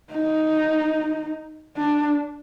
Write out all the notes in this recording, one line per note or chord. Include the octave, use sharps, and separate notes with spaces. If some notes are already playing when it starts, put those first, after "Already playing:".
D#4
D4